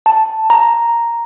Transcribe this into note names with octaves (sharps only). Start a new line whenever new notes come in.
A5
A#5